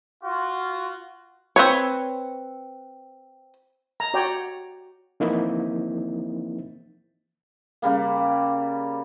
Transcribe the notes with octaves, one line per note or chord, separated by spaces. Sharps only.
F4 F#4
C4 B4 C#5
A#5
F#4 C#5 D5 G5 A#5
E3 F3 A#3 C4 D#4 E4
C#3 G3 A#3